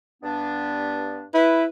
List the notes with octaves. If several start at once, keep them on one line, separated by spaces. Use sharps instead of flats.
G2 B3 D4
E4 B4